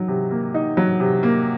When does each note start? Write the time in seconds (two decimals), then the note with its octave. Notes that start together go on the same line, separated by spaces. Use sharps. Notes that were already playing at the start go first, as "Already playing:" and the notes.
Already playing: F#3 D#4
0.08 C3
0.31 A#3
0.54 D#4
0.77 F#3
1.00 C3
1.23 A#3